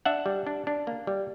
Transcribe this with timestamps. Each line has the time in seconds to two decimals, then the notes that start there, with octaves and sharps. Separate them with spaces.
0.05 D4 E5 F#5
0.26 G3
0.46 D4
0.67 D4
0.87 A#3
1.07 G3